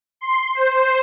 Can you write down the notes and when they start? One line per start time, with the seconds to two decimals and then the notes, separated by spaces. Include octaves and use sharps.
0.21 C6
0.55 C5